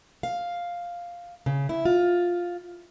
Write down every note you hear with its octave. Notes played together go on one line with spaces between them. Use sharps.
F5
C#3
E4
F4